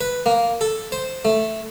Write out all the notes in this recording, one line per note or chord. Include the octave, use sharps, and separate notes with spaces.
B4
A#3
A4
C5
A3